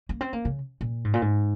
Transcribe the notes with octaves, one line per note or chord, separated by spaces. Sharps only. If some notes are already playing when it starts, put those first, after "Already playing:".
A#3
C4
A#3
C#3
A#2
G#2
A#2
G#2